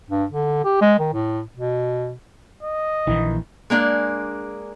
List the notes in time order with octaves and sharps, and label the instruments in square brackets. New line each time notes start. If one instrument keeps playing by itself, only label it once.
[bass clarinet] G2
D3
G4
G#3
D#3
A2
B2
[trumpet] D#5
[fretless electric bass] A#1 D#3 E3
[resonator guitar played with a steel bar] G#3 A#3 D4 G#4